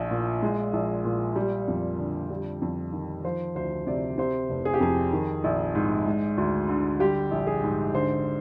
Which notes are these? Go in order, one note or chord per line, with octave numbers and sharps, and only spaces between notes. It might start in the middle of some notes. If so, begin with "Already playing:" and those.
Already playing: A#1 F3
A#2
G#3
A#1
A#2
G3
F2
D3
G3
F2
D#3
F3 C5
D2 C5
C3 D5
C3 C5
F1
G#4
G4
F2 G#4
D#3
A#1
G#2
G#3
D2
D3
G3 G4
A#1
G#4
G#2
D3 C5